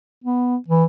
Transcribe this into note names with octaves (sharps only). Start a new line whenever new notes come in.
B3
E3